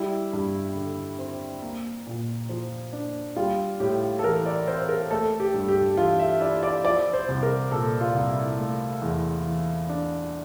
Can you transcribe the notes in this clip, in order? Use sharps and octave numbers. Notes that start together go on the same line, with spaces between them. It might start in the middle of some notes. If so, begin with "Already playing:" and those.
Already playing: G3 E4
G2
D3
C4
A#3
A#2
F3
D4
G3 F4
A2 G4
A4
E3 A#4
D5
C4 C5
A#4
A3 A4
G4
G2
G4
E3 F4
E5
E4 D5
D5
F3 D5
C5
C2
A#4
A#2 A4
F4
C2
E4
A3
E2
E3
D4